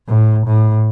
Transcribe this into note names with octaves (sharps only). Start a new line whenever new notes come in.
A2
A2